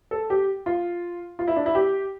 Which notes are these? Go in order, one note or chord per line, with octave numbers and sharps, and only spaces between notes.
A4
G4
F4
F4
E4
D4
E4
G4